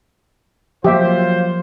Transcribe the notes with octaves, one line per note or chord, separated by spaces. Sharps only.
F3 F#3 A#3 F4 G4 C5 E5